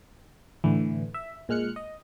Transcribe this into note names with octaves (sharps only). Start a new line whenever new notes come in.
A2 D3 E3
E5
A#2 G#3 F6 F#6 C#7
D#5